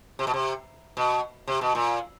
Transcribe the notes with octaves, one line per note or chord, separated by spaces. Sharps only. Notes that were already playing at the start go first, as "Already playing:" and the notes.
C3
B2
C3
B2
C3
B2
A#2